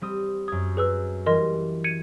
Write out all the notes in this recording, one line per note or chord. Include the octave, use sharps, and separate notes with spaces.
G3 C4 D#6
F#2 D#6 G#6
G#4 B4 E6
E3 G3 A#4 D#5 C6
G#6 C#7 D#7